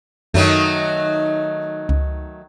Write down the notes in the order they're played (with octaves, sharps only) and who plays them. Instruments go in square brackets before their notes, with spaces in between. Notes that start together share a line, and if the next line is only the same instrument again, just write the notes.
[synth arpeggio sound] F#2 [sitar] D#3 F#3 A3
[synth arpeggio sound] C#2